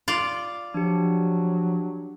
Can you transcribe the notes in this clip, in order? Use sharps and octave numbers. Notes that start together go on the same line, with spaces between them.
F4 D5
F3 F#3 D4 G4